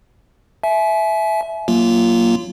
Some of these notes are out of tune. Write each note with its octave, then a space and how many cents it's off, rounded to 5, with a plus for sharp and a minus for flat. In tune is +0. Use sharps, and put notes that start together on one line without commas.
E5 +0 G#5 +40
F#3 +0 A#3 +0 F4 -15